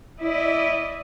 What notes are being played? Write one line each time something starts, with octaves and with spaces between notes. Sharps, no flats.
E4 D5 D#5